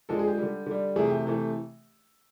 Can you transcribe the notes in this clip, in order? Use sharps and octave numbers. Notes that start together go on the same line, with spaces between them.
D3 F3 G#3 A4
G#4
G4
D3 G3
D3 G3
C3 E3 A3 G#4
G4
C3 E3 A3